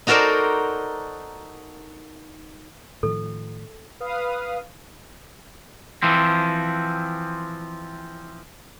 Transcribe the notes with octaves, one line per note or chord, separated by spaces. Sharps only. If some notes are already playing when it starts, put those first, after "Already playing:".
D#4 F#4 A4 A#4 C5 D5
A2 D#3 F3 A4
B4 F5 D#6
E3 F3 C4